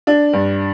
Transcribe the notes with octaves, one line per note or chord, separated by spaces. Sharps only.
D4
G2